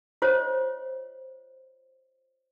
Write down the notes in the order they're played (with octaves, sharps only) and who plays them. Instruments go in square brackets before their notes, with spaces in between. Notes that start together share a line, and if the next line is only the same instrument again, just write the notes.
[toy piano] F4 C5 C#5 D#5